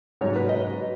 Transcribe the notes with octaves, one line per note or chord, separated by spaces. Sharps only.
G#2 F#3 C#5
B4
D#5